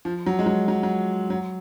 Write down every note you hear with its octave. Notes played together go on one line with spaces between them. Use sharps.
F3
F#3
G#3
F#3
F#3
F#3
F#3